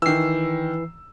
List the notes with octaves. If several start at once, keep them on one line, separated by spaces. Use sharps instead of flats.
D#3 E3 E6 C7